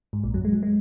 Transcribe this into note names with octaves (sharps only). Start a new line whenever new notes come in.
G#2
A#1 A#2
F#2 F#3
G#3
F#3
G#3